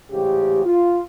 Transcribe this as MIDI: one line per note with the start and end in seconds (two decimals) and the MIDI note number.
0.11 0.63 33
0.11 0.63 44
0.11 0.63 49
0.11 0.63 67
0.65 1.01 65